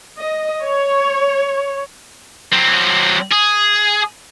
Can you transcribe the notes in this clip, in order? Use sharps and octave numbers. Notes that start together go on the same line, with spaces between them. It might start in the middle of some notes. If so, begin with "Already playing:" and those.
D#5
C#5
F#3 C4
G#4